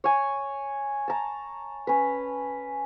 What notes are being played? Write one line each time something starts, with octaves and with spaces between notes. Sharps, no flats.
C#5 G#5
A5 A#5
C#4 B4